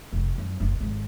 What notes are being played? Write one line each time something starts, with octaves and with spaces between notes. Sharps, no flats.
F1
F#2
F#1
G#1